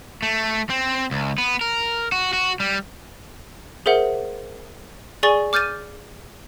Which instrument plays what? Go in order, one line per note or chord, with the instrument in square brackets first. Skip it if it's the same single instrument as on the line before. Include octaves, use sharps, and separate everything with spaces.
[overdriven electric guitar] A3
C4
C#2
B3
A#4
F#4
F#4
G3
[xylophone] G#4 A#4 C5 E5 F#5
G#4 D5 G#5 C#6 A6 G7
D6 F6 G6 A6 D#7